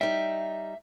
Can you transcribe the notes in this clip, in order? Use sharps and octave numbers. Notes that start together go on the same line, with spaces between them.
G3 D#4 E5